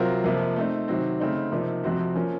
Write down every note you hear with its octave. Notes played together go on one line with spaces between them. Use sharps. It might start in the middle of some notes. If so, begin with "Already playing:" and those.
Already playing: C3 F#3 C4 F4 A#4
F2 C3 F3 A#3
A3 C4 D#4
C3 D#3 F#3 C4
C#3 A3 C4 D#4
C3 F3 A#3 D#4
F2 C3 F3 C4 F#4
F3 A#3 C#4